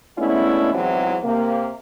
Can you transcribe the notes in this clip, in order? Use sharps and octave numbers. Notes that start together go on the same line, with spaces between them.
G#3 A3 B3 C#4 D4 E4
E2 G#2 C3 E3 F#3 C4
C3 A#3